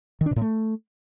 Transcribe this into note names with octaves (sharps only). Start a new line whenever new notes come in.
D#3
D4
B2
A2
A3